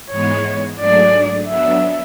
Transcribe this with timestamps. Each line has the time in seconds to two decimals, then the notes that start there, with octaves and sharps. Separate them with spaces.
0.11 G#2 E3 G#3 B3 C#5
0.79 G#2 F#3 A3 D4 G#4 D5
1.48 F#3 B3 D4 E5